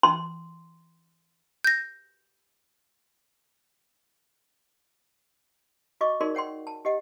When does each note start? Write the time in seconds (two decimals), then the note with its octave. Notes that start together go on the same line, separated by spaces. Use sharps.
0.03 C6
1.64 G6 A#6
6.01 F#4 D#5 C#6 D6
6.21 D#4 F#4 G#4 A#4 D5 C6
6.35 C#5 F#5 G5 C6
6.67 A5
6.85 G4 D#5 F#5